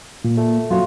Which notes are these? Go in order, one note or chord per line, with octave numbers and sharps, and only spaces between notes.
A#2
A3
F#2 F4 F#4 C#5